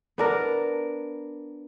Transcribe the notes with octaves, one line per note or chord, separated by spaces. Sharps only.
B3 D4 A#4